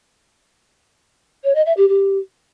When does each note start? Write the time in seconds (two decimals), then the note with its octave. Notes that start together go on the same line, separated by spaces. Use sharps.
1.44 C#5
1.55 D#5
1.66 E5
1.77 G4
1.88 G4